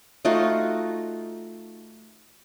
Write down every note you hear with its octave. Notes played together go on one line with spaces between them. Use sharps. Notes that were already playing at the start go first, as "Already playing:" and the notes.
A3 D#4 F4 F#4